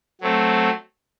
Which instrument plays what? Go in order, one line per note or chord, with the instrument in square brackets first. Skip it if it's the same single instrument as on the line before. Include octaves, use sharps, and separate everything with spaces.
[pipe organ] F#3 A3 C4